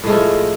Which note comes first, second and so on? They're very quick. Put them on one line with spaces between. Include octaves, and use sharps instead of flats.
A2 G#3 A3 F3